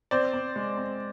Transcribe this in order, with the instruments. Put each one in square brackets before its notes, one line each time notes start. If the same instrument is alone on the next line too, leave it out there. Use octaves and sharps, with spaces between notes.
[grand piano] C4 C5 D5
C4
G#3
C4